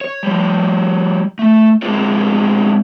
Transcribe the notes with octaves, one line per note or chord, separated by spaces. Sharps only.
C#5
F3 G3
A3
G#3 C4 F4 G#4 C#5